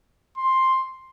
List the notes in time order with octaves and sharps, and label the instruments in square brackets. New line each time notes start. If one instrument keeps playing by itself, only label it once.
[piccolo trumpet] C6